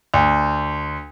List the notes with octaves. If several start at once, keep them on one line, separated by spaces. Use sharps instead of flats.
D2